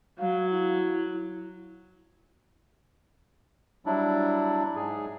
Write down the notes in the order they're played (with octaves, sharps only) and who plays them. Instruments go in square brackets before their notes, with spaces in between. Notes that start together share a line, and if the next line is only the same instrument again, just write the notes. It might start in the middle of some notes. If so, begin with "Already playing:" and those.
[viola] F#3 [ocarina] F5
[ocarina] E4
[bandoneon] F#3 G3 D4 E4
G#2 G#4